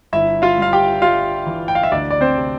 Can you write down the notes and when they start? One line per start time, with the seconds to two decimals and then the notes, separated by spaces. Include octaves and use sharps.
0.13 G1 E4 E5
0.42 F4 F5
0.58 G2 F5
0.73 G4 G5
1.02 G3 F4 F5
1.46 E3
1.68 G5
1.75 F5
1.83 E5
1.92 D2 D4 D5
2.11 D5
2.21 C4 C5
2.36 C3